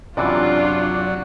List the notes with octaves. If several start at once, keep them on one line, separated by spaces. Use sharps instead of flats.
F#2 C3 E3 F#3 D4 F4 D5